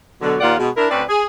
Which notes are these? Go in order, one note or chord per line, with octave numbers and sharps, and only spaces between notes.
B2 D3 F#3
D#2 A#2 A#3 F4 D5 F#5
B2 G#3
D4 E4 A#4
D2 C4 C#4 B4 D5
G#4